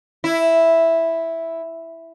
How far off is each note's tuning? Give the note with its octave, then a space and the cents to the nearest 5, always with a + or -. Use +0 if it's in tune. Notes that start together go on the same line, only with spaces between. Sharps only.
E4 +0